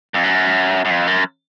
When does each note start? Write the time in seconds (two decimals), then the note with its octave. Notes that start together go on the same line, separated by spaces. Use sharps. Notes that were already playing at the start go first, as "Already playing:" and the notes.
0.14 F2
0.24 F#2
0.85 F#2
0.90 F2
1.07 F#2